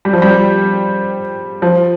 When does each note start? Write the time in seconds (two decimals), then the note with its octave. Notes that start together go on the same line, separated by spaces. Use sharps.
0.05 G3
0.13 F3
0.22 G3
1.62 F3